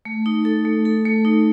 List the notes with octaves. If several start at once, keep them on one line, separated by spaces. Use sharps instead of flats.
A3
D#4
A4
A3
A4
A3
D#4